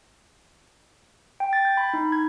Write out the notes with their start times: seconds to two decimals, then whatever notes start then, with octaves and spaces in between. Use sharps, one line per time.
1.40 G5
1.53 A6
1.65 G6
1.77 B5
1.94 D#4
2.12 G#6